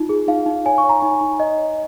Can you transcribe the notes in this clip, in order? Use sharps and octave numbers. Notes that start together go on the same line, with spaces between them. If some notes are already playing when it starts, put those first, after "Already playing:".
Already playing: D#4 F4
G#4
D#4 F5
D#4
C#5 G#5
C#6
C#5
A#5
D#4 G#5
D#4
C#5 D#5
C#5